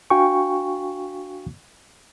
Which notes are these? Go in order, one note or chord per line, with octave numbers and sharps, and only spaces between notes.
D4 F#4 F5 G5 G#5 C#6